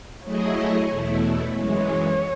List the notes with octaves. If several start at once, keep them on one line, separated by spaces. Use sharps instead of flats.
F#3 A3 E4 G#4 C#5 D#5
E2 B2 A3 E4
F#2 E3 G#3 C#5